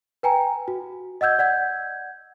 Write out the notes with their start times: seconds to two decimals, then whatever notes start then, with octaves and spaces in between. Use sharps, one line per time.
0.23 B4 G5 G#5 A#5
0.68 F#4
1.21 D#5 F#5 E6 G6 G#6
1.39 D5 F#5 G6 G#6